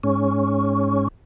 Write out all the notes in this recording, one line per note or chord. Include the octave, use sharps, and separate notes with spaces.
G#2 C#4